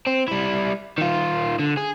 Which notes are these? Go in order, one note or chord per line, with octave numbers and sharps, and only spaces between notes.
C4
G3 E4
D#3 F4
D3
G#4